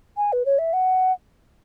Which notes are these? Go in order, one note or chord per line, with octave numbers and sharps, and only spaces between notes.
G#5
B4
C#5
E5
F#5